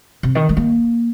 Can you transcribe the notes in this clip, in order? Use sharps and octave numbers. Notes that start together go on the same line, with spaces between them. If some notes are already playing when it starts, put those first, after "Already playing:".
C3
D#3
G#3
A#3